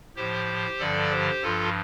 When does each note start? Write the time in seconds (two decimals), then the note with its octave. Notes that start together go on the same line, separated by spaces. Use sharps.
0.16 A2 F3 G4 C5
0.79 G2 D3 F3 A4 D5
1.11 G4 C5
1.42 G2 F3 F4 A4